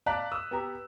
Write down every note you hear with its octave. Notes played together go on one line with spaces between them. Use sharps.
D5 F5 A5 A#5 F#6 B6
D#6 E6
B3 G4 A#5